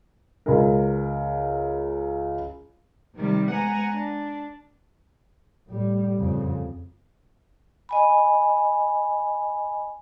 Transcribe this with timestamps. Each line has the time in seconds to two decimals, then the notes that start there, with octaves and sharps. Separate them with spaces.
0.46 C#2 A#4
3.15 C3 D#3 G3
3.50 G#3 B3 F#5 G#5 A#5 A#6
3.93 D4
5.67 A2 G3
6.18 F2 C#3
7.89 D#5 G#5 B5